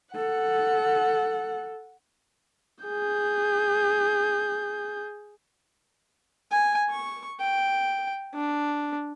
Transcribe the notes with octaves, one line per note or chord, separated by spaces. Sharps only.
A4 F#5
G#4 G6
G#5
C#6
G5
D4